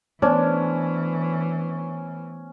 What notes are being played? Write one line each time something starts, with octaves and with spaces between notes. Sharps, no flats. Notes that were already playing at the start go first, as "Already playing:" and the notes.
E3 A3 B3 C#4 D4 C5